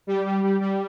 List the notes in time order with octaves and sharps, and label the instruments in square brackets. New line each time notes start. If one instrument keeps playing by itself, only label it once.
[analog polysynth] G3 G4
G3
G3
G3